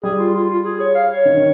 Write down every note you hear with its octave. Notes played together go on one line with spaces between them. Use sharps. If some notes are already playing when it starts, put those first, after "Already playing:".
G3 G#4
F4
F4
F4
G#4
C#5
F5
C#5
D#3
D#3